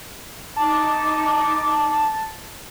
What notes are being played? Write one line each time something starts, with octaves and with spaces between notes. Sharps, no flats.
D#4 A5 D6